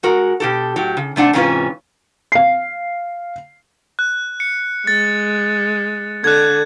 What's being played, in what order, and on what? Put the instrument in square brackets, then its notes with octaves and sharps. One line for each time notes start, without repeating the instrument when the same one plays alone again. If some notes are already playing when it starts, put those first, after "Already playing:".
[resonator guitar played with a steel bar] G#3 F#4 A#4
B2 G4 A4
A2 F#3 G4
C#3
C3 A3 D4 F#5
G#2 C3 E3 C#4 F4 B4
[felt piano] F5 C7
[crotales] F#6
C#7
[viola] G#3 [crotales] A6
[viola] D3 [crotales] F#6 G#6